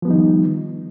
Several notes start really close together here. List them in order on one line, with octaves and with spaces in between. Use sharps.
F3 B3 G3 D#4 D#3